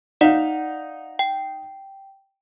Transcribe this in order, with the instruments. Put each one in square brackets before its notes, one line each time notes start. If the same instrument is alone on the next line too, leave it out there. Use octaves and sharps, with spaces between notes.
[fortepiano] D#4 F5 [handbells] D5 F#5
[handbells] G5